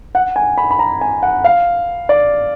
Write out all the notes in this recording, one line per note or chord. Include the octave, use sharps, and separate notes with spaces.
F#5
G#5
B5
B5
A#5
G#5
F#5
F5
D5